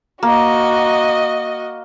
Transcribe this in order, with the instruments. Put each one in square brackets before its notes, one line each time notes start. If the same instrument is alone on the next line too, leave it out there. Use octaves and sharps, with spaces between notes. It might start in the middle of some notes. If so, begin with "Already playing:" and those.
[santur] A#3 [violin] F#4 D#5